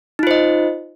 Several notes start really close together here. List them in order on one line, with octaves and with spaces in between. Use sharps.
D#4 F4 C5 D#5